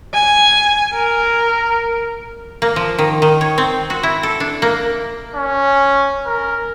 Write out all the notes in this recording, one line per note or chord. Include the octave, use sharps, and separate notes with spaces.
G#5
A#4
A#3
F3
D#3
D#3
C#5
C4
F#4
E4
A4
D4
A#3
C#4
A#4